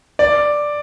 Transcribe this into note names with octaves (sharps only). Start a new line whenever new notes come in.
D5